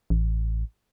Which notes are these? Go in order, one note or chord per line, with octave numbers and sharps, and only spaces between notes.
A1